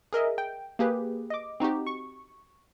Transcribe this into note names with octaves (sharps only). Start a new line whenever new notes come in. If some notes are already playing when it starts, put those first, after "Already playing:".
G#4 A#4 D#5 E5
G5
A#3 G4 G#4 B4
D#5 D6
C4 D#4 F#4 G4
C#6